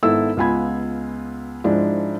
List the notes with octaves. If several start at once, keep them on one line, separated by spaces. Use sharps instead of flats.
G#1 B3 E4 A4 E6
C#2 B3 F4 G#5 B5 G#6
G#2 F3 G#3 D4 E4